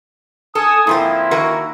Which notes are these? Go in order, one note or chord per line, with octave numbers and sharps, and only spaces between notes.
A4 G#5 A5 D#6
G#2 F3 A#3 C4 E4
D#3 F#4 A#4